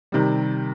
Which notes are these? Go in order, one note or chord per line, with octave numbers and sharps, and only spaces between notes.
C3 D#3 G3